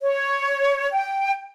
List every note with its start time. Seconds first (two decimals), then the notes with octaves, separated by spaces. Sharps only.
0.02 C#5
0.92 G5